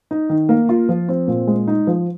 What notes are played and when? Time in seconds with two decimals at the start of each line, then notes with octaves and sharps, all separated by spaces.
0.11 D#4
0.29 D#3
0.49 A#3
0.69 F4
0.89 F3
1.09 C4
1.28 A#2
1.47 G#3
1.68 D#4
1.87 F3